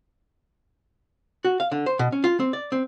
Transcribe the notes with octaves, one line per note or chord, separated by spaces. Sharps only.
F#4
F5
D3
C5
B2
C#4
F4
C4
D5
C4